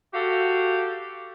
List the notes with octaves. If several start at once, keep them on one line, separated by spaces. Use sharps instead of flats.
F#4 G4 A4 F5